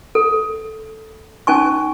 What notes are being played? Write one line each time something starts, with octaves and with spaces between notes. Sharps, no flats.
A4
C#4 D#4 G#5 C#6